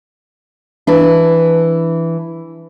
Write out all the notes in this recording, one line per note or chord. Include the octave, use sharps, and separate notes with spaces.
E3 D4